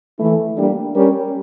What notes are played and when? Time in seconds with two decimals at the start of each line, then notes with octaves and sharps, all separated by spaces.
0.19 E3 A3 E4
0.57 G3 A#3 D4 G4
0.94 G3 C#4 G4 A#4 C#5